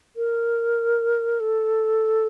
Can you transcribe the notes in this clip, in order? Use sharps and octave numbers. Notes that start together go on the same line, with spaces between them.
A#4
A4